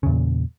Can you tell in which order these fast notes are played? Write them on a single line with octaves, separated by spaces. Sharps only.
C#3 E2 A#2